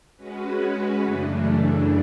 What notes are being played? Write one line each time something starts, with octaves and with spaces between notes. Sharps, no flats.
G#3 C#4 F#4 B4
F#2 C#3 E3 A3 D4